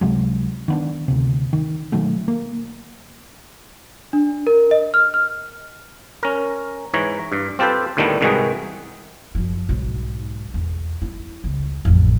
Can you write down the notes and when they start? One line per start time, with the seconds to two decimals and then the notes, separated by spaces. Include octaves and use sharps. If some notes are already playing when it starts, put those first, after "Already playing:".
0.01 C#2 C3 F#3 G#3
0.68 D#3 B3 D4
1.08 D2 C3
1.53 D#3
1.92 B2 D#3 F#3 A3
2.28 A#3
4.13 D4
4.47 A#4
4.71 D#5
4.94 F6
5.14 F6
6.23 C#4 A#4
6.94 G#2 E3 C#5 A#5
7.32 G2
7.59 C4 F4 G4 A4 B4 C5
7.97 D2 A2 D#3 G3 A3 B3
8.21 C2 G#2 D#3 E3 F#4 G#4
9.35 F#2 F3
9.69 B1 G#2
10.54 E2
11.02 E4
11.44 C#2
11.85 A1 F2